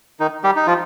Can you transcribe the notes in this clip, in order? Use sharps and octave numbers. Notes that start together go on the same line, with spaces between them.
D#3 D#4
G3 G4
D#4
F3 F4